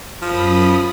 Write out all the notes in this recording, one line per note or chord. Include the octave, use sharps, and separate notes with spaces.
F#2 F3 B5 D#6